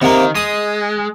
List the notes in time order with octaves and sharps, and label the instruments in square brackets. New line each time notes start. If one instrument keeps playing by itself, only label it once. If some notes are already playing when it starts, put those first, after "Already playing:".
[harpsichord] C3 A#3 [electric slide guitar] D#3
[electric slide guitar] G#3 [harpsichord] D#6